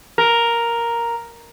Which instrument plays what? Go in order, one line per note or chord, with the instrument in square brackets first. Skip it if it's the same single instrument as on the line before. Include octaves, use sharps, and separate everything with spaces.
[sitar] A#4